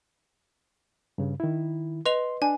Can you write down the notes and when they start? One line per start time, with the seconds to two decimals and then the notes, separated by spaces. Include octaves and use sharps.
1.18 G2 C#3
1.40 D#3 E4
2.06 B4 D#5 C6 F7
2.42 D4 G#5